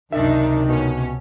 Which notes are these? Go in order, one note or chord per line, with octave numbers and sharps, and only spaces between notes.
C#2 F#2 C3 D#3 D4 D#4 E5
B2 C#4